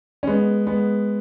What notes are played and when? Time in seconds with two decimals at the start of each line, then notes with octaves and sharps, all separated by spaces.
0.23 C#4
0.27 G#3 B3
0.67 G#3 B3